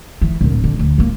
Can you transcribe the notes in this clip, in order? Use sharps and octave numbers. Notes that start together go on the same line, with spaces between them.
E3
D1 A#2
D3
D2
A1 A#3